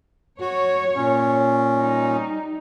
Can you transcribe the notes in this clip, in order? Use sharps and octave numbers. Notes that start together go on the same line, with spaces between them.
F#4 C#5
A#2 C#4
G3 D#4